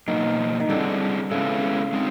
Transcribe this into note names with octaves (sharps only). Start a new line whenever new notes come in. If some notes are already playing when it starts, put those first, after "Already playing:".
B2 D#3 F#3 A#3
D#3
D3 G3 C4 E4 G#4
C#3 G#3 B3 E4 A4
G#3 C4 D#4